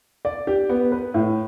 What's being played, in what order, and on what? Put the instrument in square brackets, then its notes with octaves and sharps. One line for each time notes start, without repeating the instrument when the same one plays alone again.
[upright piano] D5
G4
B3
B4
A2